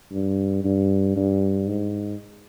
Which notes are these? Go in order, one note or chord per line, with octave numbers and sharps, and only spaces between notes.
G2
G2
G2
G#2